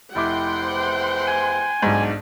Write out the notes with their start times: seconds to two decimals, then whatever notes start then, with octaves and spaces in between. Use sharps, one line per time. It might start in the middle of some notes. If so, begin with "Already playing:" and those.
0.15 F1 E4 F#5 G5 C6 D6
0.60 E2 E3 C5
1.27 G#5
1.82 B1 G#2 D4